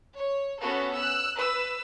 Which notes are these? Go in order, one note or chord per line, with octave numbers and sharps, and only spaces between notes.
C#5
B3 C#4 F#4 A4
E6 F#6
B4 E6